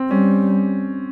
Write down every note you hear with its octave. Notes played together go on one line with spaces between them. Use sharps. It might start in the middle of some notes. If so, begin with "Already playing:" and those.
Already playing: C4
G3 C#4